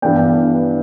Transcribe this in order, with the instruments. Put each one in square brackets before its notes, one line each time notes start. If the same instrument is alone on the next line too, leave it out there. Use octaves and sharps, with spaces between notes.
[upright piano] G2 E3 B3 D4 G5